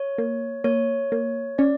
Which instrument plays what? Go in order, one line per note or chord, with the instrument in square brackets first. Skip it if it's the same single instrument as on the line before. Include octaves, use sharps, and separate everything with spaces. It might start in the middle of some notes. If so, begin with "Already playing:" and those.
Already playing: [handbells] C#5
[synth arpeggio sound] A#3
[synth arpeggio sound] A#3 [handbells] C#5
[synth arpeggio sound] A#3
[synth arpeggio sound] C#4 [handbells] D5